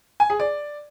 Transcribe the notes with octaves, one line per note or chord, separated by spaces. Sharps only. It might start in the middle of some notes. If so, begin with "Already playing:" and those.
G#5
G#4
D5